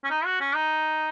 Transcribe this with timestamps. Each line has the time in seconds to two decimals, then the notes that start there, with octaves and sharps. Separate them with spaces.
0.04 C#4
0.11 D#4
0.25 F#4
0.41 C#4
0.55 D#4